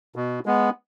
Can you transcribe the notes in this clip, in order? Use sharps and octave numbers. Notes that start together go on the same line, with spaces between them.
B2
G#3 B3